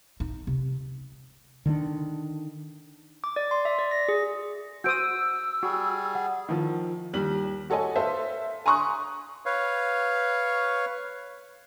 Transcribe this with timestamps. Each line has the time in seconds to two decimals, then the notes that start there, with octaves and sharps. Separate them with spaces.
0.20 D#4
0.47 C3
1.66 D3 D#3 G#3 D4
3.24 D6
3.36 D5
3.51 C6
3.65 E5
3.79 D5
3.91 A#6
4.09 G#4
4.84 F#4 C5 D#6 E6 G6 D7
5.63 G3 F#4 G#4 C#6
6.15 F#5
6.49 D#3 F3
7.13 D#2 G3 F#7
7.70 F#4 A4 C#5 D#5 G#5
7.96 A4 B4 C5 E5 F5
8.66 G#5 A#5 C6 C#6 D#6 F#6
9.46 B4 C#5 F5